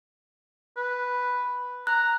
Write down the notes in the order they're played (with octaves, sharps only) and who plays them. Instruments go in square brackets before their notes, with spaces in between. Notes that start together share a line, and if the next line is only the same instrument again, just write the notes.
[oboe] B4
[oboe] A#5 [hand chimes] F#6